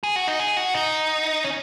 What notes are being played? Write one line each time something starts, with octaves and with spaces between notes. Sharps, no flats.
G#4
F#4
D#4
G#4
F#4
D#4
C#4